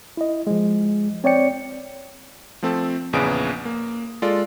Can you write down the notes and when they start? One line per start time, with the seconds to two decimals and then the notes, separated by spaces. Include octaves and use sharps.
0.17 E4 D#5
0.47 F3 G#3
1.24 C4 C#5 D5 G5 C#7
2.63 F3 A3 C4 A4 A5
3.13 A#1 E2 C#3 B4 D#6 D7
3.65 A#3
4.22 G#3 F4 A4 D5